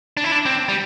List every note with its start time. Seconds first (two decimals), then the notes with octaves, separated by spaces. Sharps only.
0.17 D4
0.24 E4
0.32 D4
0.46 C4
0.69 G3